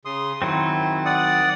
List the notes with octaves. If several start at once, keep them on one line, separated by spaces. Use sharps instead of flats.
C#3 C6 D#6
D#3 F#3 C4 E4
D5 F#5 D#6